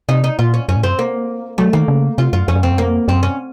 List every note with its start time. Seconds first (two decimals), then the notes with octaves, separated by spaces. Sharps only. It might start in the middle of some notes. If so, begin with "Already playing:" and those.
0.09 C3 D#4
0.24 D#4
0.39 A#2 F4
0.54 C#4
0.69 F#2 C#4
0.76 A2
0.83 F#2 C4
0.99 A#3
1.58 F#3 A3
1.73 D#3 A#3
1.88 C#3
2.18 C3 F4
2.33 F#2 F4
2.48 F2 C#4
2.56 F#2
2.63 F2 C4
2.71 F#2
2.78 F2 A#3
3.08 F#2 C4
3.23 C#4